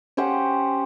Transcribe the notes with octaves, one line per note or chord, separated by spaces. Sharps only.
C#4 G4 C5 F#5